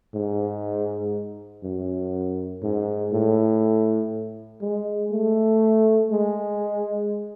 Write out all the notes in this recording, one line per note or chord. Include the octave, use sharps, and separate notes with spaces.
G#2
F#2
G#2
A2
G#3
A3
G#3